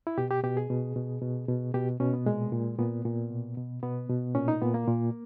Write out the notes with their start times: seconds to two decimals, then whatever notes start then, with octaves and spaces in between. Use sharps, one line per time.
0.07 E4
0.18 B2 G4
0.31 G4
0.44 B2 G4
0.57 G#4
0.70 B2
0.96 B2
1.22 B2
1.48 B2
1.74 B2 G4
2.00 B2 C#4
2.13 B3
2.26 A#2 G#3
2.52 A#2
2.79 A#2 B3
3.05 A#2
3.31 B2
3.57 B2
3.83 B2 B3
4.09 B2
4.35 A#2 C#4
4.48 D#4
4.62 A#2 B3
4.74 A#3
4.87 A#2